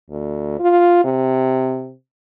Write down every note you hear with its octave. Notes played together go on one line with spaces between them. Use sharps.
D2
F4
C3